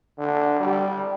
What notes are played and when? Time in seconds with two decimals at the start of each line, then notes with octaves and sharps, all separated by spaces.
0.19 D3
0.60 G3